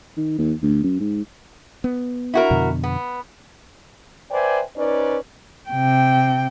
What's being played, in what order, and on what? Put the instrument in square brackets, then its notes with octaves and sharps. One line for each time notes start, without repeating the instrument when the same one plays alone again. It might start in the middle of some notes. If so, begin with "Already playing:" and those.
[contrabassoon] D#3
D#2
D2
F#2
G#2
[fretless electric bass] B3
[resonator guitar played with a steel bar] E4 F#4 A#4
[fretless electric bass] F2 B2 D3
[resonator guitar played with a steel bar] B3
[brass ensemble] B4 C5 D5 E5 G5 G#5
C#4 D#4 B4 C5 D5
[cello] C3 G5